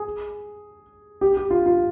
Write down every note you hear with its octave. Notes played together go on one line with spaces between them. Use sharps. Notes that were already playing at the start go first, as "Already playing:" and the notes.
Already playing: G#4
G4
G4
F4
F4